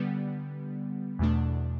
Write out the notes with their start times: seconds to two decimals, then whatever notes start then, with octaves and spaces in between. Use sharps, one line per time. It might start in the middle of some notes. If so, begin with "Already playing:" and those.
Already playing: D3 G3 B3
1.19 E2 B2 A3 D4